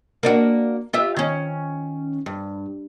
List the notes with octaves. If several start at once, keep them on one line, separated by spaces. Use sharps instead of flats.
A#3 D4 F#4
F4 G4 E5
D#3 C#4
G2